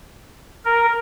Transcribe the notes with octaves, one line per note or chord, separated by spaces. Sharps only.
A#4